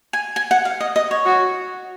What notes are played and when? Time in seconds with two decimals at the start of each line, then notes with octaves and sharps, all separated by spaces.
0.13 G#5
0.36 G#5
0.51 F#5
0.65 F5
0.80 D#5
0.96 D#5
1.11 C#5
1.26 F#4